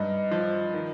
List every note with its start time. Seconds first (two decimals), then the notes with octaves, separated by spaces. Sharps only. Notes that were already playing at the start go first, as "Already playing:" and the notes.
Already playing: G2 D#4
0.31 F3
0.73 D#3